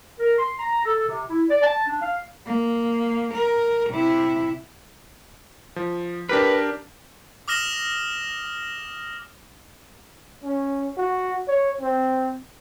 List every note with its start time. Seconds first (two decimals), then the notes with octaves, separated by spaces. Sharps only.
0.20 A#4
0.38 C6
0.59 A#5
0.85 A4
1.07 C3
1.29 E4
1.50 D5
1.62 A5
1.87 D4
2.01 F5
2.46 A#3
3.34 A#4
3.90 C3 E4
5.76 F3
6.29 D4 G4 A#4 B4
7.48 D6 D#6 F6 A#6 E7 G7
10.44 C#4
10.97 F#4
11.48 C#5
11.81 C4